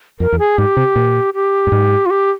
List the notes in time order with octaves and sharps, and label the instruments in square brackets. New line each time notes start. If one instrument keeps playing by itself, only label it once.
[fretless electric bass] F2 [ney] A#4
[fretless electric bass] E2
[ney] G#4
[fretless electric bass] G#2 [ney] G4
[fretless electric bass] C3
A#2
[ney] G4
[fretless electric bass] G2
G#2
[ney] F4
G4